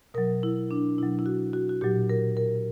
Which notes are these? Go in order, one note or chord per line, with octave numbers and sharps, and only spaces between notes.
B2 F#3 A#4
E4
D4
B2 F#3 E4
E4
F#4
F#4
F#4
A#2 F#3 G4
A#4
A#4